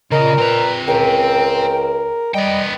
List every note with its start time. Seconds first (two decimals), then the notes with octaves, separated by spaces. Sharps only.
0.12 A#2 C#3 A#4 D#5
0.38 C4 B4 A#5
0.87 C#2 A#4 G5
2.34 G3 B3 D#5 G5